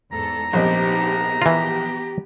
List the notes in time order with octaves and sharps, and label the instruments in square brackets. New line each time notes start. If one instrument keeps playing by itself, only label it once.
[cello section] E2 G#2 A4 [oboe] A#5
[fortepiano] A#1 C4 D#5 [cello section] B3 D#4 G4
[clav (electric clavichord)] E3 F4 [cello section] B3 G4